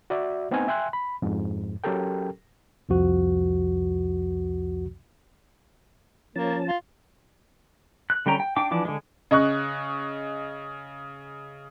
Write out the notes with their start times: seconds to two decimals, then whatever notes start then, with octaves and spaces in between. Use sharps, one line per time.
0.10 F#4 D5 E5
0.51 A3 B3 C4 D#4 F#5 G#5
0.68 E5 G5 G#5 C6 F#6
0.93 B5
1.22 F2 G#2
1.84 F#3 C#4 G4 A4 A#4 G5
2.89 C2 F2 F3 F#4
6.36 F3 A#3 C#4 A5
6.68 F4
8.10 F#6
8.26 D3 G3 C#4 G5 A#5
8.40 G5
8.56 D4 G5 D6
8.71 E3 F3 D4 D6
8.85 D3 G#3
9.31 C#3 D#5 C#6 F#6